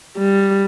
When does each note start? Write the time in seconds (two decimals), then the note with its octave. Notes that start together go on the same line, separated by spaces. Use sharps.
0.18 G3